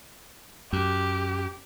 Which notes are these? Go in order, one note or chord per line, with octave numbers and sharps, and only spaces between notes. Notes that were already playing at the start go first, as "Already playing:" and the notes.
F#2 G4